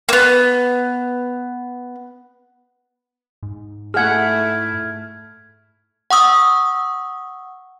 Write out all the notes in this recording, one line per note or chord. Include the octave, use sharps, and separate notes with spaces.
A#3 B3
G#2
A3 E4 G#4 F#5 F6 G#6
F#5 C#6 D#6 E6